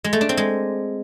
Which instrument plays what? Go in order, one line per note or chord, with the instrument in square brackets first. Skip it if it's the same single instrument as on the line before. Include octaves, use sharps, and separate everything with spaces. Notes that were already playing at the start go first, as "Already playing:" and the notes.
[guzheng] G#3
A3
D4
C4
G#3